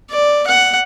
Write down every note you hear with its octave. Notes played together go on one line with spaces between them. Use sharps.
D5
F#5